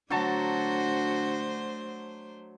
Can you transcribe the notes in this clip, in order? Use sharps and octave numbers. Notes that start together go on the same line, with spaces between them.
D3 F#3 A3 D4 F#4 C5 A5